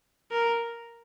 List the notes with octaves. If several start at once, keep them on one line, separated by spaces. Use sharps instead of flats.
A#4